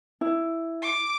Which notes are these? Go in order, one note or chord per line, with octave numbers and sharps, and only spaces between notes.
E4
D6